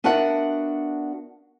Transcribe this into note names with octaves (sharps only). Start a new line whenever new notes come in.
B3 D4 F#4 A#4 E5 F#5